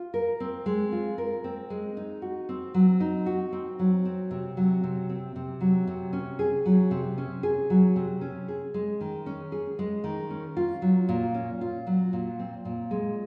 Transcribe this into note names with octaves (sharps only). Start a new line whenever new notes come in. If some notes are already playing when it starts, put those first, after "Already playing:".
Already playing: F4
A#4
C4
G#3
F4
A#4
C4
G#3
D#4
F#4
C4
F#3
D#4
F#4
C4
F#3
C4
C3
F#3
C3
C4
C3
F#3
C3
C#4
G#4
F#3
C3
C#4
G#4
F#3
C3
C#4
G#4
G#3
D#3
C#4
G#4
G#3
D#3
C#4
F4
F#3
A#2
C#4
F4
F#3
A#2
C4
A#2
G#3